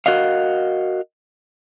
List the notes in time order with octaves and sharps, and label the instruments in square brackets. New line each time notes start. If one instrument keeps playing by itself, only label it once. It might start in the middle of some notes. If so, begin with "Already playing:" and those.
[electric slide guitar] F#4 A#4 D#5 F5